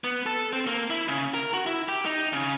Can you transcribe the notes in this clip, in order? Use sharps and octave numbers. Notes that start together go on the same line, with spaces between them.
B3
A4
C4
A#3
E4
C#3
A#4
F#4
E4
G4
D#4
C#3